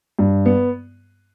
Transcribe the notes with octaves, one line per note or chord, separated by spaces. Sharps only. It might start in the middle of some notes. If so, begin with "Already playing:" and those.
G2
B3